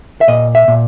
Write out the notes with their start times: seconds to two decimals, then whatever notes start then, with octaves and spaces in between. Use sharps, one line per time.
0.21 E5
0.28 A#2 D#5
0.55 E5
0.68 A#2